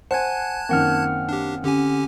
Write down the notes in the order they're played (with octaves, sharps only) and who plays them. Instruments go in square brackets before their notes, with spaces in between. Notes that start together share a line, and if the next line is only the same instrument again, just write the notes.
[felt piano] C5 [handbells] F#5 G#5 [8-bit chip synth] A5 F#6 G#6
[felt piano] F#2 D#3 A#3 [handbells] C4 F#5 F6
[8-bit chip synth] D4 G4
[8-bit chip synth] D3 G4 G#5 [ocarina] C#4